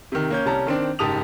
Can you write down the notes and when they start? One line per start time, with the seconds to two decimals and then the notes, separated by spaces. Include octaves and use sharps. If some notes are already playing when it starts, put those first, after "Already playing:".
0.12 C3 D#3
0.30 A#3 C#4 G6
0.46 C2 G3 C#4 A5 A#5
0.66 D#3 C4 D4
0.99 F#1 G#2 G4 A5 D#6 F7